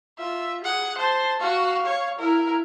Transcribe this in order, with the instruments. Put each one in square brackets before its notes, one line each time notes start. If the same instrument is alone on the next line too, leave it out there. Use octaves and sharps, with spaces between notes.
[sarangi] F4 [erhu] E5
[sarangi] G#4 [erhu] F#5
[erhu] C5 [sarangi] A5
[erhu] F#4 [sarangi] F5
[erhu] C#5
[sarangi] E4 [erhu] A#4